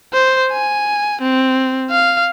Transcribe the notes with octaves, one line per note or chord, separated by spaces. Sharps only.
C5
G#5
C4
F5